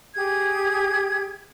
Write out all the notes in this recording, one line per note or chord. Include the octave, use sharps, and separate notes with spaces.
G4 G#4 G#6